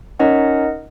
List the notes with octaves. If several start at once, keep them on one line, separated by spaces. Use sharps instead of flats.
C#4 D#4 A#4 D#5 F#5